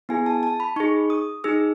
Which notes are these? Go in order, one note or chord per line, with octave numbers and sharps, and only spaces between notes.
B3 E4 G#4 G#5
A5
A5
B5
D#4 G#4 C#6
D#6
D#4 G#4 E6